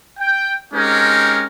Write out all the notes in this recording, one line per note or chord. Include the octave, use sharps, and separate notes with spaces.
G5
G#3 C4 C#4 D#4 G4 A#4